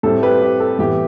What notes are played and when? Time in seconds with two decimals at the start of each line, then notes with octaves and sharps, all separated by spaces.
0.03 A2 G3 C4 A4
0.22 G4 B4
0.42 G4
0.60 A4
0.79 A2 E3 B3 G4